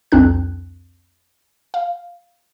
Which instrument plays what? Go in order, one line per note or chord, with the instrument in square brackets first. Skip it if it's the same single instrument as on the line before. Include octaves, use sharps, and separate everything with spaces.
[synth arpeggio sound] C2 F2 C4 D4 F#6
F5